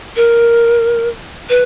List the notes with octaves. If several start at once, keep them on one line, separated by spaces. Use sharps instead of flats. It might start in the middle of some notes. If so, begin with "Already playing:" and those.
A#4
B4